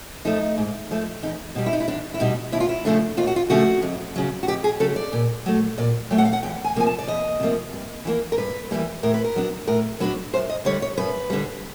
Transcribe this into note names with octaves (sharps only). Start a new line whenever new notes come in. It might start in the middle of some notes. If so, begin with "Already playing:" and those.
F3 A3 D#4
G#2
F3 A3
E2 D#4
B2 G3
E4
D#4
E4
E2 D4
E4
B2 G3 D#4
D#2 E4
F4
E4
C#3 F3 A3 D4
D#2 F4
F#4
F4
C#3 F3 A3 D4 F#4
F2
C#3 F#3
F#4
F2 G4
G#4
C#3 F#3 A4
D5
A#2
F#3 A3
A#2 D5
F#3 A3 G5
F#5
F5
F#5
E2 G5
G#5
C3 F3 A#3 G#5
A5
D5
E2 D#5
C3 F3 A#3
G2
E3 G3 A#3
A#4
G2 B4
E3 G3 A#3
A2 A#4
B4
A#4
F#3 B3 D4
A2 A#4
F#3 B3 D4 B4
F#2 C5
D#5
D3 G3 C#5
C#5
F#2 B4
D3 G3